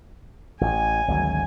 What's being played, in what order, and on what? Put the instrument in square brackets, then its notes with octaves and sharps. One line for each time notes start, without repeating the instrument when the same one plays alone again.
[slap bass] A1 [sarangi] G#5
[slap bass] G#1 D2 F#3